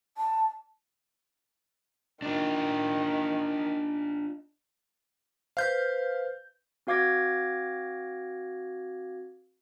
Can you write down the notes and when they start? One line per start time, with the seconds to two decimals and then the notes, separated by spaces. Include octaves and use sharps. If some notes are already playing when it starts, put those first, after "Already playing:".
0.18 A5
2.22 D#3 D4 F4
5.57 B4 C5 F5 G6
6.87 C4 F#4 F5 D6 G#6 A#6